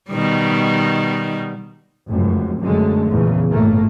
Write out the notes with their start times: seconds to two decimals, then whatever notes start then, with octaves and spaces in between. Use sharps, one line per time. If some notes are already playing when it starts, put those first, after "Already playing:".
0.10 B2 D#3 G3
2.07 F1 C#2 F#2
2.60 F#2 D3 G#3 A3
3.10 A#1 E2 C#3
3.50 G1 A2 A3 A#3